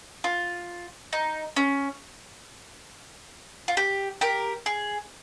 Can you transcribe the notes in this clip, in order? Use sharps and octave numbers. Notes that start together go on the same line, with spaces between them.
F4
D#4
C#4
F4
G4
G4 A#4
G#4